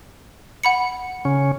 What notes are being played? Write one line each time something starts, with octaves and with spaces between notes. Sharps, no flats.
F#5 B5 C#7
C#3 C#4